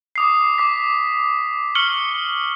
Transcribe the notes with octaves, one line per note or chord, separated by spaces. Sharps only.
D6 D#6 C7
D6 B6
C#6 F6 C#7 F#7 G7